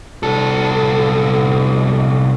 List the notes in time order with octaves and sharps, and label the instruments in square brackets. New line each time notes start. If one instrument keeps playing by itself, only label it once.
[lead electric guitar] C2 A4